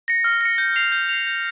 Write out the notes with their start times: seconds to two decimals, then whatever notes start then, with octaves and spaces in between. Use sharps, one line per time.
0.08 A#6 C#7
0.24 F6
0.41 A#6 C#7
0.58 G6
0.76 C7 F7
0.92 G6
1.09 C7 F7
1.27 G6